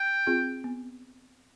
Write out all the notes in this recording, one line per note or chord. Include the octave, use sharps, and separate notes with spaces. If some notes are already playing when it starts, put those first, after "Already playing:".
Already playing: G5
C4 F4 G#4
B3